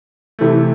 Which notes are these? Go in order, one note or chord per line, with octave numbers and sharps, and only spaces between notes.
C3 E3 A3